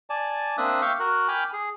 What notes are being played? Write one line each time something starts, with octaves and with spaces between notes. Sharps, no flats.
D5 G#5 A5
A#3 C4 D4 E5 D#6 F#6
E5 F5 G5 C#6 D6
F#4 A#4 F#6
G5 G#5 B5 D6 F6
G#4